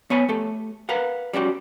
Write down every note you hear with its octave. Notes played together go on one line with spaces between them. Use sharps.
B3 C#5 G#5 B5
A3 G4 A4
A#4 B4 F5 F#5
G3 C#4 F#4 G4